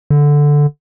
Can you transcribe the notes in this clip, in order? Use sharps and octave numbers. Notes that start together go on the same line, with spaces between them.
D3